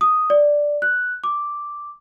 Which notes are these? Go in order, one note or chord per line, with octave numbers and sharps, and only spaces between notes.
D#6
D5
F#6
D6